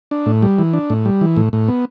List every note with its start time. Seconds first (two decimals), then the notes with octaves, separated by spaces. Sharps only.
0.11 D4
0.26 A2
0.42 G3
0.58 E3
0.73 D4
0.90 A2
1.05 G3
1.21 E3
1.36 A2
1.53 A2
1.68 B3